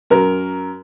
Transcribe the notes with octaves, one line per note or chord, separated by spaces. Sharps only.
F#2 A#4